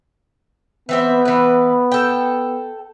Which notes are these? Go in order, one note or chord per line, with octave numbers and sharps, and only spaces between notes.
E3 B3 C4 E5
E3 B4
A4 G5